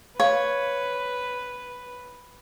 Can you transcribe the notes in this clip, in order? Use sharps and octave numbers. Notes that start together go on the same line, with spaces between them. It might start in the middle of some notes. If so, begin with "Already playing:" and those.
B4 C#5 F5